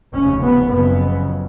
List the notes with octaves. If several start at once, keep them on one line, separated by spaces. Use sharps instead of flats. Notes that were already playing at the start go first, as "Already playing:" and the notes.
F1 D#2 C#3 C#4
B3
F#1 F2 C#3 B3